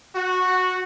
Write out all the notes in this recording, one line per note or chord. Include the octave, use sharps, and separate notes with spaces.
F#4